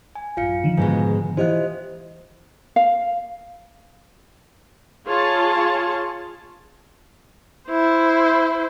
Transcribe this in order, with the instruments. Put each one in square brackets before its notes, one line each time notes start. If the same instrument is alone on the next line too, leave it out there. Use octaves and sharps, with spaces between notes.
[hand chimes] G#5
[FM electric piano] A1 F#2 [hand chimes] F4 F5 C#7
[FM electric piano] D3 D#3 F3
[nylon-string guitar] G#2 B2 G#3
[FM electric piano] E3 G4 [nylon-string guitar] E4 F4 [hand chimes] C5 D#5 F#6
[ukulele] F5
[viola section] F4 G#4 C#5 A5
[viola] E4 C5